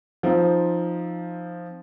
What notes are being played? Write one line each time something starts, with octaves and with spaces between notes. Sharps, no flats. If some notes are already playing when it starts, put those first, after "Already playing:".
F3 C4 D#4